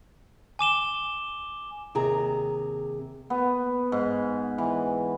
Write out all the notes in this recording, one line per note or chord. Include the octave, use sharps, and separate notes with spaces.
G#5 D6 E7 G7
D#2 C3 G#4 A#5
B3
G#2
E3